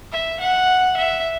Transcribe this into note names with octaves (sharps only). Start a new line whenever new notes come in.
E5
F#5
E5